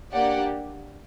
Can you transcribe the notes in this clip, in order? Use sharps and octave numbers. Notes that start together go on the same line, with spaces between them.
A#3 D4 G4 D5 F#5